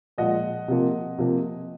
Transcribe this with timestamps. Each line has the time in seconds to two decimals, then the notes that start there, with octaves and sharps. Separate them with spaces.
0.18 A#2 F3 G#3 D#5 F#5
0.68 C3 F3 A#3
1.18 C3 F3 A#3